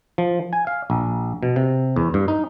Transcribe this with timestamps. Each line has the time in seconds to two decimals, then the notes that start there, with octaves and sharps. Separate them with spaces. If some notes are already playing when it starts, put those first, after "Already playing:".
0.18 F3
0.53 G#5
0.67 F5
0.90 A#1
1.43 B2
1.56 C3
1.96 E2
2.14 G2
2.28 D#4